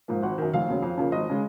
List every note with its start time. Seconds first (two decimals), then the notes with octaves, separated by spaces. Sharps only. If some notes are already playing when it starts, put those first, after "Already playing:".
0.08 G#2 F3 A#3
0.23 G#1 F#5
0.38 F#2 D#3
0.54 F1 F5
0.69 D#2 C#3 F#3
0.82 F2
0.97 C#3 F3 A#3
1.12 G#1 D#5
1.29 C#3 G#3